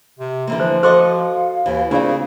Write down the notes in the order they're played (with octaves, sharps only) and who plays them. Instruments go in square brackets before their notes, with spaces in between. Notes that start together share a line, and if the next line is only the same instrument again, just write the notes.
[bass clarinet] C3
[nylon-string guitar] D3 E3 A#3
[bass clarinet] F3 [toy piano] C5
[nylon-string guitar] F#4 A4 D#5 [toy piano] C5 C6 D6 [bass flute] F5
[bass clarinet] D#2 [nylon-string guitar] E3
[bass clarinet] C#3 [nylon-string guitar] A#3 C4 [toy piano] D4 F4 D5